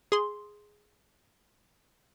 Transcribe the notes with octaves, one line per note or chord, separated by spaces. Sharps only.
G#4 C6